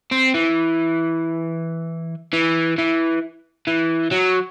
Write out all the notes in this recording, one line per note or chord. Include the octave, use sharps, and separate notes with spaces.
C4
E3
E3
E3
E3
F#3